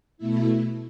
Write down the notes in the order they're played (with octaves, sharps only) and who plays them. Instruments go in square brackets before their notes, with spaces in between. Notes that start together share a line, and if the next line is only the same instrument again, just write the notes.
[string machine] B2 A3 E4